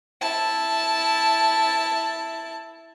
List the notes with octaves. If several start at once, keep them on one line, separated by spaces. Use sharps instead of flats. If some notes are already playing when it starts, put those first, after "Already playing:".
E4 A5